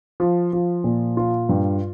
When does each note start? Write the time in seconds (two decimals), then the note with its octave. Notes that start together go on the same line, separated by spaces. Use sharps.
0.20 F3
0.53 F3
0.84 A#2
1.17 F4
1.49 G2